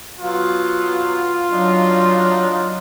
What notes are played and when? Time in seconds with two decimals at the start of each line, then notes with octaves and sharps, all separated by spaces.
0.19 F#3 B3 F4
1.52 F#3 D4 D#4